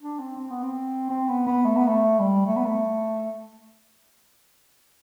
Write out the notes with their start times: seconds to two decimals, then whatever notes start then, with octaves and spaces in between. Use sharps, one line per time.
0.01 D4
0.19 C4
0.38 C4
0.50 B3
0.63 C4
1.10 C4
1.28 B3
1.47 B3
1.65 A3
1.77 B3
1.88 A3
2.19 G3
2.46 A3
2.56 B3
2.65 A3